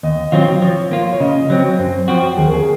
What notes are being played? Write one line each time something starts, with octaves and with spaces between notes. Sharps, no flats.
D#2 D#5
D#3 F#3 C4 F4 C#5
F3 C#5
A#3 F4 F5
C#5
C#3 D#5
F#3 C4 C#5
F#2 C5
F3 C4 F#4
D#2 G#4
A#4
G#4